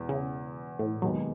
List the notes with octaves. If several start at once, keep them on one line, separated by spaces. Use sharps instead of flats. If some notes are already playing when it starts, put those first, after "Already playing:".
Already playing: E1 E2
C#3
A2
E1 D#2 D#3 F#3 G#3 B3